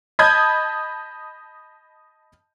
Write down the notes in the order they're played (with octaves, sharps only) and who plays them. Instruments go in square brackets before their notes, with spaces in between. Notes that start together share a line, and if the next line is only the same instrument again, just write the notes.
[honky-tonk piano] D#5 A5 B5 D#6 G6 G#6